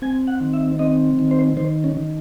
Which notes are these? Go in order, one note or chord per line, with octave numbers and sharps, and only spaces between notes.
C4 G#5
F#5
D#3
E5
C4 D#5
D#3
C5
D#3 C5
C#4
D#3